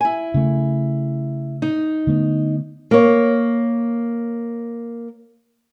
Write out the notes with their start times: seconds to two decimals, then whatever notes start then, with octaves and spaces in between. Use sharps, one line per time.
0.01 E4 G#5
0.34 C#3 A3
1.62 D#4
2.07 D3 A3 B3
2.91 A#3 C#5